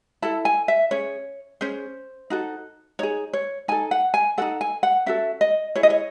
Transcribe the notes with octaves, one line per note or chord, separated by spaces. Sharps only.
E4 A4 A5
G#5
E5
C#4 G#4 C#5
C#4 G#4 C5
D#4 F#4 A4
D#4 G#4 C#5
C#5
D#4 A4 G#5
F#5
G#5
D#4 F#4 A4 F#5
G#5
F#5
C#4 F#4 A4 E5
D#5
E4 G#4 C#5
D#5
C#5